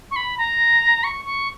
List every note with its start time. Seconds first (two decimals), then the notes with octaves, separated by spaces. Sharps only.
0.11 C#6
0.16 B5
0.38 A#5
1.04 C#6
1.25 C#6